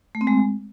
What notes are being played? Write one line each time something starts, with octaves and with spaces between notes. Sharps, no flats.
A3
C4
G#3